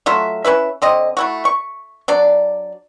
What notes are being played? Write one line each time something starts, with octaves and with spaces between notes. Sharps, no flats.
F#3 A3 F4 E5
C#4 E4 B4 E5
D3 C4 D#5
A3 E4 F#4
C#6
F#3 D4 D5